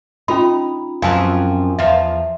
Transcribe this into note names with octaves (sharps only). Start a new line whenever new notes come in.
C#4 D#4 F4 B5
F#2 F3 C4 F5 G#5 A5
E2 F3 E5 F5